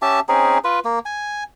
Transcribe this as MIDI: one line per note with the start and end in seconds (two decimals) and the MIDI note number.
0.02 0.20 61
0.02 0.20 67
0.02 0.20 76
0.02 0.20 81
0.29 0.58 60
0.29 0.58 61
0.29 0.58 63
0.29 0.58 68
0.64 0.79 65
0.64 0.79 71
0.85 0.99 58
1.05 1.44 80